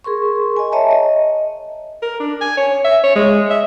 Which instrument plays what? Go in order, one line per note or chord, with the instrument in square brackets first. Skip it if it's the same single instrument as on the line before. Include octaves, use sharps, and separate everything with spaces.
[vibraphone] G#4 A#4 C6 C#6
D#5 G#5
C#5 D#5 E5 A5 A#5
D#5
[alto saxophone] A#4
D4
G#5
C#5
E5
C#5
G#3
E5